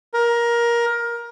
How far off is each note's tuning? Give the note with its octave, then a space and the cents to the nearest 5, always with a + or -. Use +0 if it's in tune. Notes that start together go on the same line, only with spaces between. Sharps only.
A#4 +20